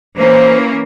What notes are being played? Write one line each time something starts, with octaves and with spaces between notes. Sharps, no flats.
E3 A#3 C#4 C5